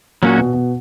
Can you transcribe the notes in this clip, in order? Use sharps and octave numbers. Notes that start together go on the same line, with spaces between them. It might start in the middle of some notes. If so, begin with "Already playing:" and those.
A#2 F#3 A#3 C#4 F#4
B2
B2